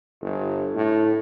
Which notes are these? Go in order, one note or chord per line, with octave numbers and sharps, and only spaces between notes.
G1
A2